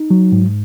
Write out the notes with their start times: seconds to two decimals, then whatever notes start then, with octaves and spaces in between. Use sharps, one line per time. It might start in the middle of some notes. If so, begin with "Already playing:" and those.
Already playing: D#4
0.11 F#3
0.32 G#2